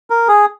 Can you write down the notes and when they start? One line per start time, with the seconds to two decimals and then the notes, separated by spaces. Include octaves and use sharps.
0.10 A#4
0.28 G#4